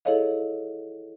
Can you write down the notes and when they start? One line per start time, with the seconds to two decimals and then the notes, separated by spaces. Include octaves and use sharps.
0.05 E4 G#4 A4 C#5 D#5 F5